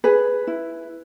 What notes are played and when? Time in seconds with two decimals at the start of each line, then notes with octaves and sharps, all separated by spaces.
0.04 G#4 B4
0.47 E4